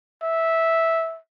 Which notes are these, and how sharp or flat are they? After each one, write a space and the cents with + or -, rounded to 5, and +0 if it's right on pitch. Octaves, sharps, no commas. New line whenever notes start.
E5 -10